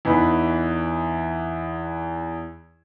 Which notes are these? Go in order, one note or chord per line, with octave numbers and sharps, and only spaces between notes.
E2 E3 D#4 B4 B5